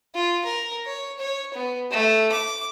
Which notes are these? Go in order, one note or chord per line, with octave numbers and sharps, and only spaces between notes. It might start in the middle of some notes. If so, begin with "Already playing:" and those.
F4
A#4
C#5
C#5
B3
A3
D6